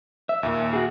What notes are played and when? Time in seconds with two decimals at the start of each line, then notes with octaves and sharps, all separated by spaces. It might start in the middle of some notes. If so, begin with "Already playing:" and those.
0.29 E5
0.43 D#2 A#2
0.73 F#4 G#4